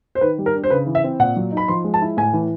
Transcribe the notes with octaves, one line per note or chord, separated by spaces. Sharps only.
C5
D#3 B4
G3
A#4
D4
C5
C#3 B4
E3
E5
C4
A#2 F#5
F#3
D#4
B5
F3 C6
G#3
A5
E4
A2 G#5
E3